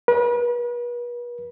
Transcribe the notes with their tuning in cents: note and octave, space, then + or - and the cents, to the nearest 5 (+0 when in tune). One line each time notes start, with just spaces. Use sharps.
B4 -40